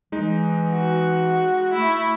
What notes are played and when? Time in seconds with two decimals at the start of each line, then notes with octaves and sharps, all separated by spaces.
0.12 E3 G#3 D#4
0.71 F#4
1.73 A3 E4